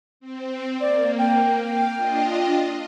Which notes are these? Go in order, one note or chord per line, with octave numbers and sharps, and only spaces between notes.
C4
A#3 D5
G5
F5
D4 F4 D#5